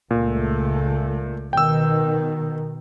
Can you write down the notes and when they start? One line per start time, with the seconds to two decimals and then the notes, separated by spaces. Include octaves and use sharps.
0.11 C#2 A#2 A3
1.53 B2 D#3 G5 E6